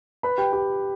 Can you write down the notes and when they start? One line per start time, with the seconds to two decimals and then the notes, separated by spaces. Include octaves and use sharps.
0.23 B4 B5
0.38 G4 G5
0.53 G4 G5